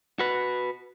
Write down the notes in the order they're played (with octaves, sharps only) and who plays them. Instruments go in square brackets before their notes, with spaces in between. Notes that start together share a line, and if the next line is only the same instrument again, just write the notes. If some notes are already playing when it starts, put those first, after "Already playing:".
[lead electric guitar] F#4 B4